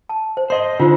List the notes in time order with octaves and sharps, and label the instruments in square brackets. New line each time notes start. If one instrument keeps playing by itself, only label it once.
[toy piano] A5
C5
[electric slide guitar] C5 D#5 [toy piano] C6
[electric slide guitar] D3 [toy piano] D#4 F4 C5